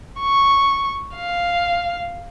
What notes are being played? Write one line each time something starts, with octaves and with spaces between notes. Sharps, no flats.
C#6
F5